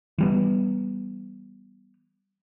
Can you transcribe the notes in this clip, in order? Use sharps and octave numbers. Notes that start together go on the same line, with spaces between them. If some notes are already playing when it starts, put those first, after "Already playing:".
E3 G3 B3